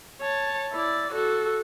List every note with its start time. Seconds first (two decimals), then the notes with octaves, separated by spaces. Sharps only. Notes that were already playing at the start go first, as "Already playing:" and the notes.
0.21 C#5 A5
0.72 E4 D5
1.13 F#4 A4